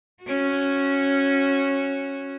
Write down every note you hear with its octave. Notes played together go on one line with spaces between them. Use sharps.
C#4 F#4